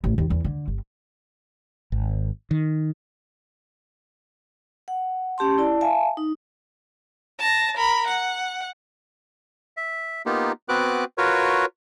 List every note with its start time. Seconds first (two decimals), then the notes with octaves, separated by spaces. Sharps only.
0.04 A1
0.18 D#2
0.30 E2
0.44 D3
0.68 G1
1.92 G#1
2.51 D#3
4.88 F#5
5.38 C#4 G4 A5 C6
5.58 E4 D5 A5
5.81 E5 F5 G#5 A5
6.17 D#4
7.40 A5 A#6
7.77 A#4 B5
8.07 F#5
9.77 E5
10.26 A#3 B3 D#4 F4 G4
10.69 B3 C4 F#4 B4 D6 F#6
11.18 F4 F#4 A#4 B4 C#5